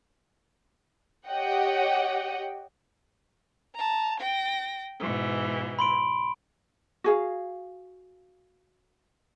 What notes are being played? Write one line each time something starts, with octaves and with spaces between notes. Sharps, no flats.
G4 C#5 D#5 F#5 G5
A5 A#5
G5 A#6
G#2 B2 E3
B5 C6 D7
F#4 G#4 F5